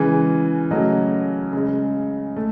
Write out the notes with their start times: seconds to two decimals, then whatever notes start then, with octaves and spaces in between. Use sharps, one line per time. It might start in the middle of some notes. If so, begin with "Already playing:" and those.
Already playing: C#3 E3 G#3
0.71 C#3 F#3 A3 D#5
1.53 C#3 G#3
2.36 A3